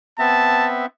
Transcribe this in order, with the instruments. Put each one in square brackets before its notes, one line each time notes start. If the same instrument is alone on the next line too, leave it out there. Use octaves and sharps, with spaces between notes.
[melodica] B3 C4 E5 [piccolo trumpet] A5